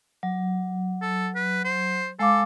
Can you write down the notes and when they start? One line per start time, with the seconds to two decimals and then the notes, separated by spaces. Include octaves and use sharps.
0.23 F#3
1.01 A4
1.35 B4
1.65 C5
2.19 G#3 A4 F5 D6